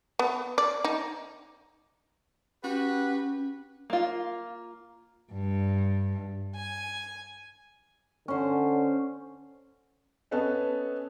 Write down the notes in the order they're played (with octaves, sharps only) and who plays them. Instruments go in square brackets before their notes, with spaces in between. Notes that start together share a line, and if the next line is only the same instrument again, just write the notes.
[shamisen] B3
D5
D#4
[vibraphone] C#4 [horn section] F#4 G4 B4
[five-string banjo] A#3 F4
[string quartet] G2
G#5
[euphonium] D3 [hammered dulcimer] C#4 C5
[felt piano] B3 C#4 A4 B4 D#5